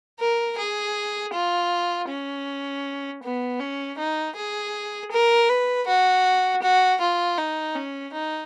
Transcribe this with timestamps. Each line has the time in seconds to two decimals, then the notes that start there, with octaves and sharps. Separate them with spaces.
0.20 A#4
0.58 G#4
1.33 F4
2.09 C#4
3.23 B3
3.60 C#4
3.98 D#4
4.35 G#4
5.11 A#4
5.49 B4
5.87 F#4
6.62 F#4
7.01 F4
7.38 D#4
7.75 C#4
8.13 D#4